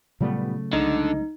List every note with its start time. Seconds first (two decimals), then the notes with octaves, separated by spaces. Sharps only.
0.21 A#2 C#3 F#3 G3 A3 B3
0.73 C2 D3 G#3 D#4 D#5